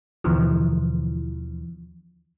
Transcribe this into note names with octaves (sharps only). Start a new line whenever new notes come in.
D#2 B2 D3 E3 F3